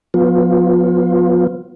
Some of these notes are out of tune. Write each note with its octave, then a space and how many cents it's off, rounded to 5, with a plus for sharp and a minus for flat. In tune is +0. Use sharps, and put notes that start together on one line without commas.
F3 +40 B3 +0 F4 +15